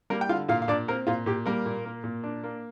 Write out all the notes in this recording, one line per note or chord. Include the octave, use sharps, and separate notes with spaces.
G3 A#3 A#4
G5
D3 F4 F5
A#2 F4 F5
F5
A#2 D4 D5
A#3 C4 A#4
A#2 F4
A#2 G4
G3 A#3 A#4
A#2
A#3
A#2
D4
A#3